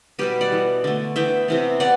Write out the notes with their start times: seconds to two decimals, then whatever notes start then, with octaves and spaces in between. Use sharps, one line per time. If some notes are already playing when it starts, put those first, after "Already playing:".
0.19 B2 G3 B3 G4 B4
0.41 D5 F#5
0.52 E3 B3
0.84 D3 A3
1.16 E3 B3 E5 G5
1.48 C3 E3 B3
1.80 B3 D5 F#5